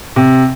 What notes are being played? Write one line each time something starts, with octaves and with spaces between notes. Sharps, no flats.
C3